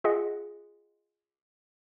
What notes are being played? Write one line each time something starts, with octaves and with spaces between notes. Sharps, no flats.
F4 G#4 D#5 F#5